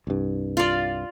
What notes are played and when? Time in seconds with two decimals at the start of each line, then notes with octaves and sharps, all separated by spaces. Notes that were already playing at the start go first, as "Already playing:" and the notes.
0.07 C2 G2
0.57 F4 D5